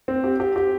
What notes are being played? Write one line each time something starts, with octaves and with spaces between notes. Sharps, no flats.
C4
G4
G4
G4